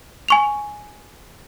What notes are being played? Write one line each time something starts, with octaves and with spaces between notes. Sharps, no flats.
G#5 C#6 F7